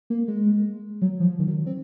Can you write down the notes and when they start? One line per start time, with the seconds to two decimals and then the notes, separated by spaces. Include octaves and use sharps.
0.10 A#3
0.28 G#3
1.02 F#3
1.20 F3
1.39 D#3
1.48 F#3
1.66 C4